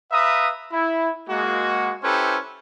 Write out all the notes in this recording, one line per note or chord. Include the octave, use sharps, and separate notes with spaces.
B4 E5 F5 A#5 D#6
E4
G#3 A#3 F#4
C#4 E4 G4 A4 B4 C5